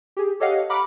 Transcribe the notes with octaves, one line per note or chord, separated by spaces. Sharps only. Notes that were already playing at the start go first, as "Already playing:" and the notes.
G4 G#4
G4 A4 C#5 D#5 F5 F#5
F#5 A#5 B5 D6 F6